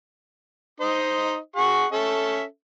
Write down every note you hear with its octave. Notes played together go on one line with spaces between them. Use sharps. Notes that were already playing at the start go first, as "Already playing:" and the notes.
D#4 C5 D#5
G#4 F#5 C#6
C#4 A4 E5